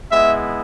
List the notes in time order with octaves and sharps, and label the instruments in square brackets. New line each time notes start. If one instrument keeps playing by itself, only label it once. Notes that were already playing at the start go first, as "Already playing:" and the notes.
[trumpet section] G#3 B3 E4 E5